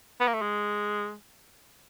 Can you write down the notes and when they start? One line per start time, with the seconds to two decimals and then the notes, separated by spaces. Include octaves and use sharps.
0.20 B3
0.27 A#3
0.34 A3
0.42 G#3